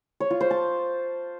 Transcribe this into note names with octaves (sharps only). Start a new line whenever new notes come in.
C#5
F4
C5
A5